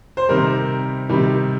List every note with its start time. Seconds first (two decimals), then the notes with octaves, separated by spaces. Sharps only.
0.17 C5
0.29 C3 D#3 G3 A#4
1.09 C3 D#3 G3